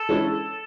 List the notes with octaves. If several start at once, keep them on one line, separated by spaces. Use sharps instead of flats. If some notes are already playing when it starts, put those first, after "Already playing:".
Already playing: A4
E3 G#3 C#4 E4